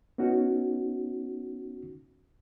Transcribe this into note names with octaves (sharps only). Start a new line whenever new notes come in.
B3 C#4 D#4 F#4